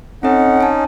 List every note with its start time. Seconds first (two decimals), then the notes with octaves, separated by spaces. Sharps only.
0.23 C4 C#4 D#4 A4 D#5 F#5
0.61 G#5 A5